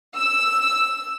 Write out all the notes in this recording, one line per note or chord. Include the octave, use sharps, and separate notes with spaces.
E6